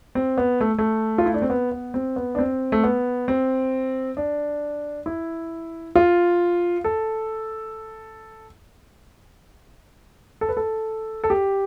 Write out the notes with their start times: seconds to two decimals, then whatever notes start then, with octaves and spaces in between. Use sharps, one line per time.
0.15 C4
0.38 B3
0.61 A3
0.78 A3
1.18 F4
1.26 E4
1.34 D4
1.42 C4
1.50 B3
1.72 B3
1.94 C4
2.16 B3
2.35 D4
2.39 C4
2.72 A3
2.83 B3
3.28 C4
4.17 D4
5.06 E4
5.95 F4
6.84 A4
10.41 A4
10.49 B4
10.57 A4
11.24 A4
11.30 G4